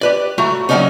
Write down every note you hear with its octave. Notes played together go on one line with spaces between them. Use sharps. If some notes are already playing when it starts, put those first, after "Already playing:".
G4 B4 D5
A2 A3 F#4 A#5
F#3 G3 A3 A#3 C#4 D#4